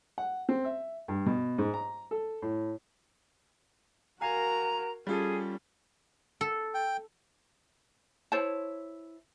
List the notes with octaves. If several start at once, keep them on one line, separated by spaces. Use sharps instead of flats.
F#5
C4
E5
G2
B2
G#2
A#5
A4
A2
F#4 A#4 F5 G#5 A#5 C7
G3 C#4 F4 G#4 A4
A4
G5
E4 C5 C#5 A5